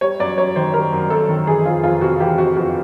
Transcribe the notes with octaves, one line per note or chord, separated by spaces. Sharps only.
G3 C#5
F#2 D5
F#2 C#5
D#3 C5
G3 A#4
F#2
F#2 A4
D#3
E3 G#4
F2 F4
F2 F4
C3 F#4
E3 G4
F2 F#4
F2 F#4